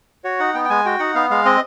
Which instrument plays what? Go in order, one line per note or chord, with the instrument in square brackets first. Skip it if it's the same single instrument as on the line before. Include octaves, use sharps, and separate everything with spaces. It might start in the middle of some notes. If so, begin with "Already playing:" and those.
[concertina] F#4 C#5
D#4 F#5
B3 G5
G5
G#3 G#5
F#4 G5
D#4 F#5
B3 F5
G#3 F5
C4 D#5